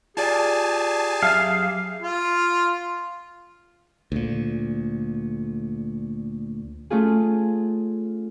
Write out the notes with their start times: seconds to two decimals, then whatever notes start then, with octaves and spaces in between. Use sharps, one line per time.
0.17 F4 G4 G#4 D5 G#5 A5
1.23 F#2 E5 F5
2.02 F4
4.12 D2 A#2
6.90 A3 C#4 F4 G#4